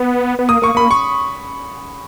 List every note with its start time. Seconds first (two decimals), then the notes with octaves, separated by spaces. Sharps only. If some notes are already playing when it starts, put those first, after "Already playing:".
Already playing: B3
0.39 B3
0.49 A#3 D#6
0.62 A#3 C#6
0.75 A#3 B5
0.91 C#6